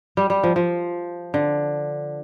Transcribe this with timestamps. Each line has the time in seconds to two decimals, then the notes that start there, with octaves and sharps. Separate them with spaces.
0.17 G3
0.30 G3
0.43 F3
0.56 F3
1.34 D3